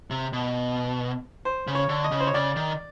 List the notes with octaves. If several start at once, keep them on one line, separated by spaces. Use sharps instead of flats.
C3
B2
C5
C#3
C#5
D3
D#5
C#3
C5
C#5
C#3 D5
D#3